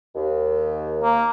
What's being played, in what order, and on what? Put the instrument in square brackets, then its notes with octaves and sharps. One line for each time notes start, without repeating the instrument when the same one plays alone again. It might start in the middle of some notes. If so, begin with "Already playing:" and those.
[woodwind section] D#2
[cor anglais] A#3